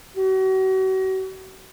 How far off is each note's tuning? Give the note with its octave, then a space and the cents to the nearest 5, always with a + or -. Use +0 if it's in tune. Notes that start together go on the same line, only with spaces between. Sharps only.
F#4 +40